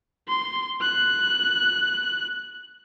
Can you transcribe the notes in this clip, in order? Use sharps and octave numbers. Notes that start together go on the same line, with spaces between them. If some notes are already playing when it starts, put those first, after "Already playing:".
C6
F#6